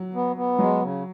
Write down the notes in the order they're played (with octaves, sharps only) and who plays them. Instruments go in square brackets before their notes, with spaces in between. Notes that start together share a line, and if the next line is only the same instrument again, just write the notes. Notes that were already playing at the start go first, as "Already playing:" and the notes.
Already playing: [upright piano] F#3
[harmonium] B3
B3
[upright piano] F#3 [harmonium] G#3
[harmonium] C#3